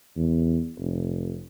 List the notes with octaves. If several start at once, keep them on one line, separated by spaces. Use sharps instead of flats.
E2
F1